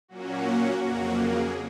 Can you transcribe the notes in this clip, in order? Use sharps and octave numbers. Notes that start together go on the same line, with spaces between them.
A#2 F#3 A#3 C#4 F#4
F2 C#3 F#3 A#3 F#4
G#4